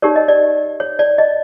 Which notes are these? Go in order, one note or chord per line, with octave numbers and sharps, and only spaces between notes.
D#4 G4 A#4 C#5 D5
D#5
D5
C#5
D5
D#5